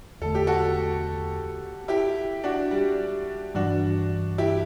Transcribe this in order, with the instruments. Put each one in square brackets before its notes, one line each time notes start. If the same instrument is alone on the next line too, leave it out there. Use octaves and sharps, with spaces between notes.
[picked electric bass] E2 D3 A3 [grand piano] A4
[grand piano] G4
F#4 A4
E4 G4
D4 F#4
G3
[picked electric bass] G2 E3 G3 [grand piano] D4 F#4
[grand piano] E4 G4